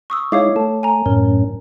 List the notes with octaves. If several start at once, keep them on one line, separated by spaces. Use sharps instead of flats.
C#6 D#6 E6
G#3 D#4 E4 C#5 F5 D6
A3 A5
G#5 A#5
F#2 A2 C#4 A#4